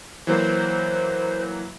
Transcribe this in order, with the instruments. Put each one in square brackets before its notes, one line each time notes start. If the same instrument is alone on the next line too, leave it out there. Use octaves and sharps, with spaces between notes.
[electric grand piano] E3 F#3 A#3 [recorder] C5